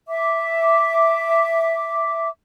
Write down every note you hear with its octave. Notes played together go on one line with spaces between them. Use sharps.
E5 D6